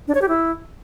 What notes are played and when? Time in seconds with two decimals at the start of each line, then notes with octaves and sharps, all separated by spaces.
0.08 D4
0.15 C#5
0.22 G4
0.29 E4